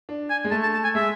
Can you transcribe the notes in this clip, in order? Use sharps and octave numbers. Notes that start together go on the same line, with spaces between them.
D4
G#5
G#3
A3 A5
A5
A5
G#5
G#3 E5